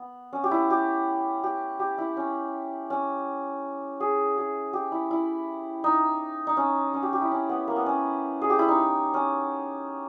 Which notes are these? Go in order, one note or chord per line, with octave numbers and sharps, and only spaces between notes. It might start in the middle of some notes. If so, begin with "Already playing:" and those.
Already playing: B3
C#4
G4
E4
G4
G4
G4
E4
C#4
C#4
G#4
G#4
G4
E4
E4
D#4
D#4
C#4
C#4
G4
G4
E4
C#4
B3
A#3
B3
C#4
G#4
G4
E4
D#4
C#4